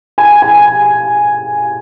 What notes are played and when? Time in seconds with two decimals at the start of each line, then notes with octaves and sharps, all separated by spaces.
0.18 G#5
0.42 G#5